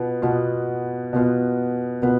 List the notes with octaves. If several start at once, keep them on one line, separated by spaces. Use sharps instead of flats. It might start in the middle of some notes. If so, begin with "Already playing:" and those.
Already playing: B2 B3 F4
B2 B3 F4
B2 B3 F4
B2 B3 F4